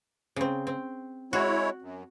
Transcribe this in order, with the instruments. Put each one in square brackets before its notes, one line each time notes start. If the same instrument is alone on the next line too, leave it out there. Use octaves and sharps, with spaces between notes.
[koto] C#3 C4
C4
[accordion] G#3 E4 C#5 [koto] F#4
[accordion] F#2